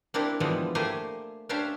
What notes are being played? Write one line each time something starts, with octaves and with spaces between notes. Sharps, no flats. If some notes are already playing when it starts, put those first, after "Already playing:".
A#3 C4 D4 E4 G4
B2 E3 F3 G3 G#3 B3
A3 A#3 G4 C5 G#5
C#4 D4 G4 C5 E5 F5